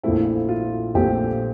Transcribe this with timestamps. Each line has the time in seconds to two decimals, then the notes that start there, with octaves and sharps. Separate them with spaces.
0.03 A#1 A#2 A3 C4 E4
0.49 F4
0.95 A#1 A#2 A3 C4 G4